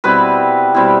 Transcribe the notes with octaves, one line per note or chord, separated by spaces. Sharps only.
B2 G3 C4 E4 B4
B2 G3 C4 E4